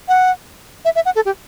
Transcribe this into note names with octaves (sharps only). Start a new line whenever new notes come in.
F#5
E5
E5
F#5
A4
G4